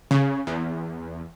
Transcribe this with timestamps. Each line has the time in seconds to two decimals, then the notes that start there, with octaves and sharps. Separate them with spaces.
0.11 C#3
0.47 E2